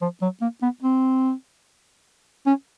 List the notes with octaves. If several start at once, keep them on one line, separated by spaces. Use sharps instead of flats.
F3
F#3
A#3
B3
C4
C#4